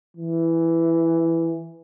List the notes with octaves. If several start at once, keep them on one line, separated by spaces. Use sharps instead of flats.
E3